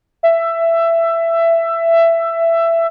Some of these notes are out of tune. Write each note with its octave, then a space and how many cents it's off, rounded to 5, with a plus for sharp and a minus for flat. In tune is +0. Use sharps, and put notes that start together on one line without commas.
E5 +15